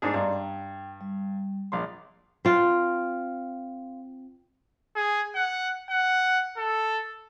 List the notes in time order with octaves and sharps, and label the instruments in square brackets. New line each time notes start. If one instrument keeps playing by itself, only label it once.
[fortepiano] G#2 D4 G#4 [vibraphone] D#5
[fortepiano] G2 [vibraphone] D5 A#5 C6
[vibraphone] G5
G3
[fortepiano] A#1 F5 C6
[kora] C4 F4
[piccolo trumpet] G#4
F#5
F#5
A4